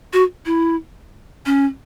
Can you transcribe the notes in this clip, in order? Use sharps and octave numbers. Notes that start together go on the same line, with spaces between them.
F#4
E4
C#4